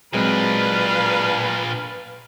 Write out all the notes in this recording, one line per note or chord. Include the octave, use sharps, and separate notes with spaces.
A#2 F#3 G#3 C4 D4 B4 F5